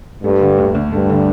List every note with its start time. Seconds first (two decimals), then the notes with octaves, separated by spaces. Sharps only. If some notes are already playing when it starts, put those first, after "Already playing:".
0.24 G2 A3
0.41 D3
0.58 D2
0.75 D2
0.92 G2 A3
1.10 D3